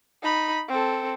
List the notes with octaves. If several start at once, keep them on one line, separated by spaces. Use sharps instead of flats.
D#4 B5
C4 A4